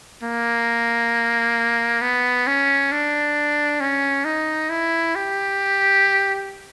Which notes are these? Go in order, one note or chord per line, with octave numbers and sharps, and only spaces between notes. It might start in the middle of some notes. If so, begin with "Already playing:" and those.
A#3
B3
C#4
D4
C#4
D#4
E4
G4